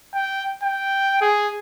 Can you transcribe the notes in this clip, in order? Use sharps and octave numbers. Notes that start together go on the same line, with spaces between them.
G5
G5
G#4